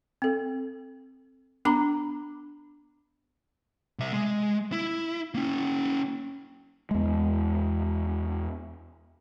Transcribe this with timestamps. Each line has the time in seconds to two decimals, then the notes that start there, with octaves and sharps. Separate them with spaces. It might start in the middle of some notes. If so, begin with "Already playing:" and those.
0.22 C4 A4
1.65 B3 D4 A#5 B5 D6
3.99 C2 E5
4.13 G#3
4.72 E4
5.34 A#3 C#4
6.91 E2 G#3